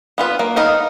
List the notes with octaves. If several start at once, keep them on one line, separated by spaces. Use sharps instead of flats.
B3 F4 B4
A#3
B3 D#4 D#5 F5